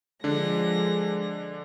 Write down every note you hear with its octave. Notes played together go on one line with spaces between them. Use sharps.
D3 F3 G#3 D4 A#6